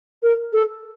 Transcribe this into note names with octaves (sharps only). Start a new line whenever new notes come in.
A#4
A4